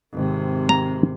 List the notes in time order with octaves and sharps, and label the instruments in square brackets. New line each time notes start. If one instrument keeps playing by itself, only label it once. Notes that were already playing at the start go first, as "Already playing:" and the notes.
[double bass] G#1 C3
[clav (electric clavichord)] A#5